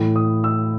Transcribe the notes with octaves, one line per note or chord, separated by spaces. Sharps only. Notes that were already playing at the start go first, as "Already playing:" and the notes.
Already playing: A2 E3
D#6
E6